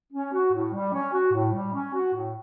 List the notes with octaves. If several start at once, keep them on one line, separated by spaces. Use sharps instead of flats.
C#4
F#4
A2
G3
C#4
F#4
A2
G3
C#4
F#4
A2